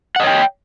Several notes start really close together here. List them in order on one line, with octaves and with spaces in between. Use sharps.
F#5 D#5 C#5 G5